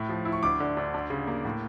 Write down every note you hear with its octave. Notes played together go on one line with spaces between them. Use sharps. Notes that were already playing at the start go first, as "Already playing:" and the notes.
Already playing: A2 E4
F3
E4
C#6
D2 D6
D3
D2
D2
C#3
A#3
A2